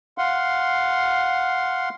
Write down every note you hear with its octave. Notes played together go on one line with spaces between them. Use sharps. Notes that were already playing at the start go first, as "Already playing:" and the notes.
F5 F#5 C6